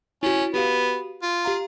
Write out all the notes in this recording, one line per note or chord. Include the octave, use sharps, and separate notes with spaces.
C#4 E4 F#4
B3 F#4 G4 F5
F4
G4 F5 A#5